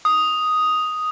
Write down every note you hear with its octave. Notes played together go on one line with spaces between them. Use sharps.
D#6